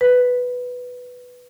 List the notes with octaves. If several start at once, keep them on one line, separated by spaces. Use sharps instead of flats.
B4